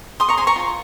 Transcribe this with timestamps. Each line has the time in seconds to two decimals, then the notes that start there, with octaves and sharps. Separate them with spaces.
0.20 G#4 C6 D#6
0.29 A#5 C#6
0.37 C5 G#5 C6
0.47 A#5 C#6
0.56 F4